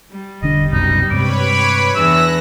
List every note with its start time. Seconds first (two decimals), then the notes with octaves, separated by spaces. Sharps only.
0.11 G3
0.42 E1 D3 D4 D#5
0.73 C2 F#2 B2 D#4
1.11 G2 C3 G#3 B4 C#5 B5 D6
1.95 E2 E3 D4 E6 F#6 A#6